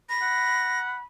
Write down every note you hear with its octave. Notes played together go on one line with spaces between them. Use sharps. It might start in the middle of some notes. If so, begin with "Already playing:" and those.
B5 A#6
F#5